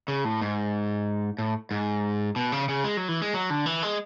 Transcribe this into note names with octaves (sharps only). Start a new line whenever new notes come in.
C#3
A2
G#2
A2
G#2
B2
C#3
C#3
G#3
F#3
E3
G#3
F#3
D3
E3
G#3